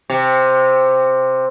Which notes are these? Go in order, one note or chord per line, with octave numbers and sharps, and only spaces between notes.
C3